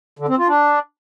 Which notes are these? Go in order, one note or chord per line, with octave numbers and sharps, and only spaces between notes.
D3
C4
F4
D4